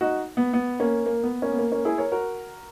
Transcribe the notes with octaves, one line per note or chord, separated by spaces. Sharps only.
D#4 F#4
B3
B3
A#3 C#4
A#3
B3
A#3 C#4
B3
A#3
A#3 C#4
E4 G#4
A#4 C#5
F#4 A#4